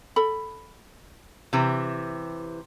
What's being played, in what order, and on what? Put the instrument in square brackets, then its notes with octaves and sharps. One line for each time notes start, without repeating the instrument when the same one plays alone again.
[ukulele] A4 B5
[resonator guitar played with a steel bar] C3 E3